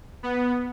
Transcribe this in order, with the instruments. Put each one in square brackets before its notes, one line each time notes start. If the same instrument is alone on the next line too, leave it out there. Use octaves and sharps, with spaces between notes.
[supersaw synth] B3